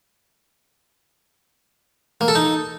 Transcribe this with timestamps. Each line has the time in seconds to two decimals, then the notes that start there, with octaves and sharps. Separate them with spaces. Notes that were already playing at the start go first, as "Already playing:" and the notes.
2.21 A#3
2.28 A4
2.35 D#4